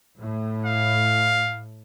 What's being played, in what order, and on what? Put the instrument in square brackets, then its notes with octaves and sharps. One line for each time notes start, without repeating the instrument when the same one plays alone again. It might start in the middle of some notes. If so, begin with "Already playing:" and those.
[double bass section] A2
[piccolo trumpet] F5